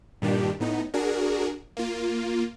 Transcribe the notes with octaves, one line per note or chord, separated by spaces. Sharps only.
G2 A#2 D#3 G3 D4 G4
A2 B3 D#4
D4 F#4 G#4 A#4
A#3 F4